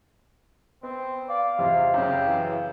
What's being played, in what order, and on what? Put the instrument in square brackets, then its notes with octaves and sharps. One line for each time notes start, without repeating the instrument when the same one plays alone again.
[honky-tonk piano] B3 [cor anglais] C4
[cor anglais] D5 [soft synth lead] F5
[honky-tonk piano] E2 D#5 [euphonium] C3 [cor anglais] F4
[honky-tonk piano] F#2 C#3 [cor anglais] G4
[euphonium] E3